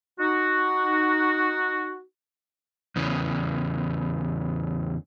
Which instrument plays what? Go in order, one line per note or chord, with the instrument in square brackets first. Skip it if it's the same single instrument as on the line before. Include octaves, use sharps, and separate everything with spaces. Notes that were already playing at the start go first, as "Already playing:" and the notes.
[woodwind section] D#4 F#4
[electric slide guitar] E2 C#3